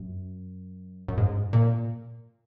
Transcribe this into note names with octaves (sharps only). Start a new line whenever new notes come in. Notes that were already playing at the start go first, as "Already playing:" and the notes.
Already playing: F#2
F#2
G#2
A#2